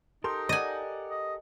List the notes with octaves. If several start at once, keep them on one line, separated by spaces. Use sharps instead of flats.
D#4 G4 A4 A#4 C6
D5 D#5 F#5 G#5
D#5